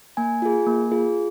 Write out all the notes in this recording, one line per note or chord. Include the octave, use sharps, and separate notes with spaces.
A#3 G#5
F4 G#4
A#3
F4 G#4